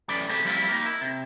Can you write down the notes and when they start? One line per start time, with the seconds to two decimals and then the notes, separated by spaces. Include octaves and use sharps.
0.08 F#2 A2 E3 D5 B5
0.29 C3 A3 G4 G#4
0.44 F3 G3 C4 E4 F4 G4
0.68 A#3 D#4
0.86 E4
1.01 C3